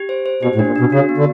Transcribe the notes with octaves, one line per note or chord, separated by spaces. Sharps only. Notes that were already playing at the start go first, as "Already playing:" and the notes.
Already playing: G4
C5
C5
B2 G4
A2
D4
A#2
B2 D4
C#3 F#4
B3
D3